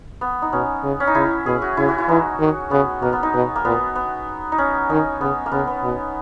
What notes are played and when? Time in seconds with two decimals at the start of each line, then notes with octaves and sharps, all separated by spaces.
0.21 B3
0.42 D#4
0.53 B2 C#4
0.83 C#3
1.00 C#4
1.07 D#4
1.15 C#3 E4
1.46 B2 G#4
1.62 F#4
1.77 C#3 E4
1.89 F#4
1.98 E4
2.09 E3 D#4
2.40 D#3
2.71 C#3 B3
3.02 B2 A#3
3.13 B3
3.23 D#4
3.34 B2
3.56 A#3
3.64 A#2 B3
3.95 B3
4.52 D#4
4.58 C#4
4.90 D#3 D#4
5.21 C#3 B3
5.46 A#3
5.52 C#3 B3
5.67 B3
5.84 B2